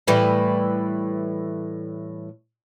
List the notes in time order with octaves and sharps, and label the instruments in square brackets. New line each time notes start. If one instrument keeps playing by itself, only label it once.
[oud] A2 E3 G3